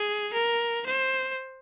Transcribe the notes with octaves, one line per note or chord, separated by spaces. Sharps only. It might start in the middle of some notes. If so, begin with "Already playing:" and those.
Already playing: G#4
A#4
C5